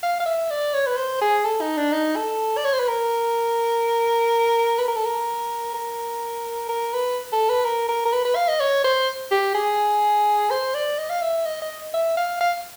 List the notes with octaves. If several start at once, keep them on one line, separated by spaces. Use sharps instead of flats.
F5
F5
E5
D5
C#5
B4
C5
G#4
A4
D#4
D4
D#4
A4
D5
C#5
C5
B4
A#4
B4
A#4
A4
A#4
A#4
A#4
B4
A4
B4
A#4
A#4
A#4
B4
B4
F5
D#5
C#5
C5
G4
G#4
C5
D5
D#5
F5
E5
D#5
D#5
E5
F5
F5